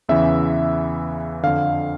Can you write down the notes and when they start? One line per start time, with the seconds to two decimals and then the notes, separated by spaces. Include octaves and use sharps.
0.09 E2 C#3 E3 E5
1.43 F2 D3 F5